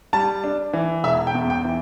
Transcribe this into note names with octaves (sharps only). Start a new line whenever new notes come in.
G3 A5
D4
E3
E1 E5
G5
E2
G5
E3